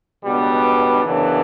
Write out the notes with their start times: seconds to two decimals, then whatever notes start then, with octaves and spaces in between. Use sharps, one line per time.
0.24 C#2 B2 G3 B3 D4
1.04 F#2 C#3 E3 B3 D4